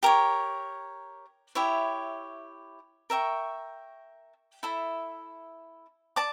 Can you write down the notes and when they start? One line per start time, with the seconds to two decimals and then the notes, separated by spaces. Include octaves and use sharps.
0.03 G4 A#4 C#5
1.55 E4 G4 C#5 E5
3.10 A#4 E5 G5 C#6
4.63 E4 A4 E5
6.16 D5 A5 D6